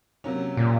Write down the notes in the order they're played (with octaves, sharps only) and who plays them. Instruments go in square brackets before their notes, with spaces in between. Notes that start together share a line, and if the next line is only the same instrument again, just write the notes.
[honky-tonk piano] C3 F#3 A#3 C#4
[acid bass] A#2